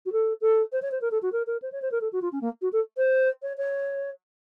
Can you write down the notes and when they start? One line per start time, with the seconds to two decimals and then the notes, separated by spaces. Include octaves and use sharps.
0.05 F#4
0.12 A4
0.41 A4
0.72 C5
0.82 C#5
0.91 C5
1.01 A#4
1.11 A4
1.22 F#4
1.32 A#4
1.46 A#4
1.62 C5
1.72 C#5
1.82 C5
1.91 A#4
2.01 A4
2.12 F#4
2.21 F4
2.32 C#4
2.41 A#3
2.61 F#4
2.72 A4
2.97 C5
3.42 C#5
3.57 C#5